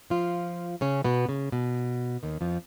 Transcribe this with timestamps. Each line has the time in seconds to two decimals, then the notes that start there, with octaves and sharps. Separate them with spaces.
0.10 F3 F4
0.81 C#3 C#4
1.05 B2 B3
1.29 C#3
1.52 B2
2.23 D#2 D#3
2.41 F2 F3